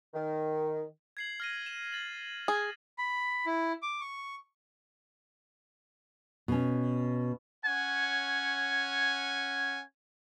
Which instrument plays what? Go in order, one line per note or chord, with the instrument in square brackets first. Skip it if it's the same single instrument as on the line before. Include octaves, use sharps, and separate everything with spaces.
[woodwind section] D#3
[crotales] G#6 C7 F#7
F6 A#6 D#7
E7
A6 F#7
[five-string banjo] G#4
[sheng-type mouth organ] B5
E4
D6
C#6
[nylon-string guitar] B2 C#4
[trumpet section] C#4 C#5 F#5 G#5